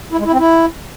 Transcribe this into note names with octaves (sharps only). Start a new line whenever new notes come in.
E4
G#3
E4
C4
E4